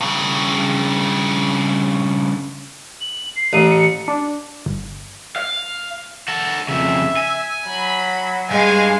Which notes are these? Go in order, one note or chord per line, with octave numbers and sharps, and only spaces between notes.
G2 C#3
F#7
C7
A1 D#7
C#7
D4
G1
F5
F#4 A4
F2 C#3 E5
G#5
F#3 B5
G2 G#3 F5 G5 G#5